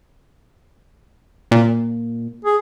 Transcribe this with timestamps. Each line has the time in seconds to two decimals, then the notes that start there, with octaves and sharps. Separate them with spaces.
1.52 A#2
2.45 G#4